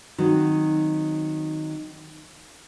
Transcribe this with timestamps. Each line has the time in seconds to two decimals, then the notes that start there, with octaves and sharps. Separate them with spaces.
0.18 D#3 F#3 C4 D#4